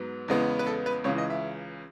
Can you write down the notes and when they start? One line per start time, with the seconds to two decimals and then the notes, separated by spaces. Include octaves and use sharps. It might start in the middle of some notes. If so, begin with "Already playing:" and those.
Already playing: G#2 F#3 B3
0.28 E2 C#3 G#3 B3
0.59 B4
0.66 A4
0.86 B4
1.04 C#2 C#3 E3 C#5
1.18 D#5
1.30 E5